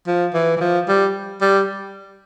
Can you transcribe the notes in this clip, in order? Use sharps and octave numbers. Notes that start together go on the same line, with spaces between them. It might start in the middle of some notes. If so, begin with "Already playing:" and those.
F3
E3
E3
F3
G3
G3